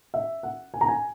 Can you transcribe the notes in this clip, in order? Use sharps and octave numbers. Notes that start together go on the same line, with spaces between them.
E5
F#5
G#5
A#5
G#5